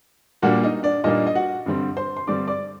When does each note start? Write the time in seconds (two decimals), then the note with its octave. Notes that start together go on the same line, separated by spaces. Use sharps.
0.42 A#2 G3 A#3 D4 F#4 F#5
0.63 D#4 D#5
0.83 D4 D5
1.04 A#2 G3 A#3 D4 D#4 D#5
1.27 D#5
1.35 F#4 F#5
1.66 G2 D3 G3 C4
1.97 C5 C6
2.17 C6
2.27 G2 D3 G3 C4 D5 D6
2.48 D5 D6